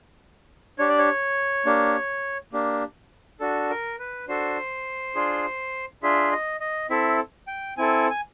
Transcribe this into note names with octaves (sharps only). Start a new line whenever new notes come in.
D4 G4 C#5
D5
C#5
A#3 D4 G4
A#3 D4 G4
D4 F#4 A4
A#4
B4
D4 F#4 A4 C5
D4 F4 G#4
D4 F4 G#4 E5
D#5
D#5
C4 E4 A4 E5
G5
C4 E4 A4 G#5
G#5